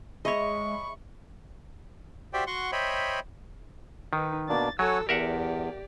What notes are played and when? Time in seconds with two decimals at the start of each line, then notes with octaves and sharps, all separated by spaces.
0.25 G#3 G#4 C#5 D#5 E5 B5 C#6
2.33 F#4 G4 C5 D5 E5 G5
2.47 F#4 F#5 C6 C#6
2.72 C5 C#5 D#5 E5 G5 B5
4.13 D#3 D#4 B4
4.49 B2 A#3 D4 A6
4.79 F#3 A4 C#5 F#5 G#5 E6
5.09 E2 G4 A#4 D5 E5 F#5